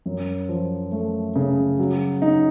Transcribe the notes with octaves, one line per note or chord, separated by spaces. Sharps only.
F#2
F3
A3
C#3
F#3
D#4